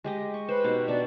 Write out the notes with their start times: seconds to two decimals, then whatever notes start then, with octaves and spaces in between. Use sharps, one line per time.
0.04 G#3 G4 D#5
0.34 C#6
0.49 B4 C5
0.64 B2 D#4 G4
0.88 B2 D4 D5